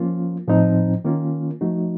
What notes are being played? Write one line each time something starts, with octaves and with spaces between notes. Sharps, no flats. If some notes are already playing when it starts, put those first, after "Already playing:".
Already playing: F3 A#3 C#4 F4
A2 F3 C4 D#4
D#3 A#3 C#4 F4
F3 A3 D#4 F#4